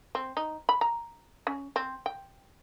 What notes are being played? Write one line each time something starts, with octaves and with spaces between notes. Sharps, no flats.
C4
D#4
B5
A#5
C#4
C4
G5